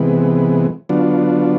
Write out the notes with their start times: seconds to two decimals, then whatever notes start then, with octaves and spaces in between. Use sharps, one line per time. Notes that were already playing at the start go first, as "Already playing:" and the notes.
Already playing: C3 E3 G#3 B3
0.89 D3 F#3 B3 D4 F4